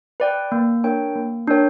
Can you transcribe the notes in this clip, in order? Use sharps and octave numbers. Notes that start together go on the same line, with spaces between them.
B4 D5 G5
A#3
D4 A#4 C#5 G5
A#3
D4 A#4 C#5 G5